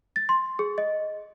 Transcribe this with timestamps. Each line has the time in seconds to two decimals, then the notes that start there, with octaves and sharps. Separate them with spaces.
0.16 A6
0.29 C6
0.59 G#4
0.78 D#5